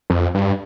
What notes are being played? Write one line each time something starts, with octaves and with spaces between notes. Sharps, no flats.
F2
G2